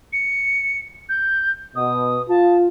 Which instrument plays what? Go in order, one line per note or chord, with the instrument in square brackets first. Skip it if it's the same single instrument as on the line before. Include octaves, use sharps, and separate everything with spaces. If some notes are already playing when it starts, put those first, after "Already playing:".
[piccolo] C#7
G6
[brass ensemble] B2 [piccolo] D#6
[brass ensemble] F4 [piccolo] A5